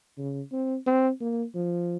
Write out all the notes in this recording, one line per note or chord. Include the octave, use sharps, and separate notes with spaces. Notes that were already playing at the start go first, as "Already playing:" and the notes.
C#3
C4
C4
A#3
F3